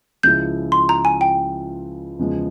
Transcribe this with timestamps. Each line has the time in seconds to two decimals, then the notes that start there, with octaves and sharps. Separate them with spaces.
0.23 C#2 C#3 F3 G#3 E4 G6
0.72 C6
0.89 A#5
1.05 G#5
1.21 G5
2.19 E2 C#3 F3 G#3